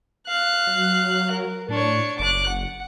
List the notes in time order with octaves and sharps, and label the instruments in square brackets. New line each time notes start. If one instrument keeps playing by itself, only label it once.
[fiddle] F5 F#6
[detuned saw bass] F#3
[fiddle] A#4
[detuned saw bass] A2 [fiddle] D4 C#5
[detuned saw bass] F#1 [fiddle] D6 F#6
[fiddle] F#5